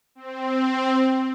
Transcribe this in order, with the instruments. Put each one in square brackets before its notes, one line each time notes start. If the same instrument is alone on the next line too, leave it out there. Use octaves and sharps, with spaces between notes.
[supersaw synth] C4